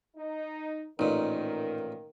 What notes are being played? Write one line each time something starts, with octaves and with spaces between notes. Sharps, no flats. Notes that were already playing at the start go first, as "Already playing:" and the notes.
D#4
A1 A#2 D#3 A#3 D#4 A#4